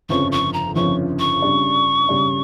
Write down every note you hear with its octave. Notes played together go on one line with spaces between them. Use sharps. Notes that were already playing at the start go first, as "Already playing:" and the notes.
G1 F2 C#3 F3 C#4 C#6
C#6
A#5
G1 F2 C#3 F3 C#4 C#6
C#6
C#3 G3 D4
C#3 G3 D4